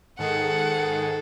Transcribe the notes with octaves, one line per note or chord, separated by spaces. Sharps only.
G#2 D#3 G#4 A4 F#5